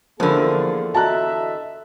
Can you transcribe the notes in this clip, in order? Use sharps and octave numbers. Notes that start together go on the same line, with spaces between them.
E2 D3 F3 A#3 F4 G#4 A#4 B5
F#4 D#5 E5 A5 A#5 F#6